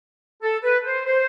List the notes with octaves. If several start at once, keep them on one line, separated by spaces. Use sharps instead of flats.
A4
B4
C5
C5